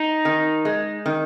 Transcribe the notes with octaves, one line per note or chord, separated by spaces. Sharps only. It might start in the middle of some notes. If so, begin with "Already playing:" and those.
Already playing: D#4
D#3
G#3
D#3